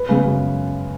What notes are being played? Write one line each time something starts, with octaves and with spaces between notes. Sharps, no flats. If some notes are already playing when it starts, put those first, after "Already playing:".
Already playing: B4
C#3 G#3 B3
F#2